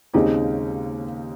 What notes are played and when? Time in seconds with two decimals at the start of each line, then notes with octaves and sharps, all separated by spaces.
0.13 D#2 C#3 G#3 C4 D#4 G4